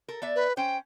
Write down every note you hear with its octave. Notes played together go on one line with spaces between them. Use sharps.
A4 A#4
B3 D5 E5
B4
C#4 C5 G5